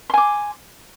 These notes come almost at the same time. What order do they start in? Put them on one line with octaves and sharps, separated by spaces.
C6 G#5 D6